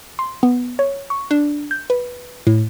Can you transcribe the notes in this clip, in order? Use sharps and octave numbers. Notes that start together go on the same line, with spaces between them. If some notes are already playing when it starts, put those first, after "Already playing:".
C6
B3
C#5
C#6
D4
G6
B4
A2